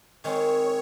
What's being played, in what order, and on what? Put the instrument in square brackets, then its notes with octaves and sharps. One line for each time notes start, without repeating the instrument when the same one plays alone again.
[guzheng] D#3 G#3 C4 [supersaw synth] C#5